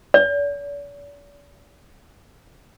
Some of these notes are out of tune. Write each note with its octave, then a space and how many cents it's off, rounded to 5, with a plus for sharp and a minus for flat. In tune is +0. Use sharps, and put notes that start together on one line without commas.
D5 -45